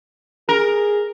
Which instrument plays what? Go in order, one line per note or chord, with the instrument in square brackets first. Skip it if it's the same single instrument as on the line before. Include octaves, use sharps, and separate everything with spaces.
[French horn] G#4 [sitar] A#4